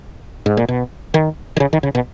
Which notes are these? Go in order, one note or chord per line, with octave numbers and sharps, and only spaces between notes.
G#2
A#2
B2
D#3
D#3
C#3
D#3
C#3
B2